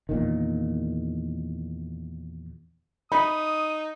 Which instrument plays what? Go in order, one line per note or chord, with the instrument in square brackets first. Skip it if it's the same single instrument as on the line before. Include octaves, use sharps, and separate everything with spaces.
[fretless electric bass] E2 A#2 D#3
[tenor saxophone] D#4 [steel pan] B5 [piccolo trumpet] D#6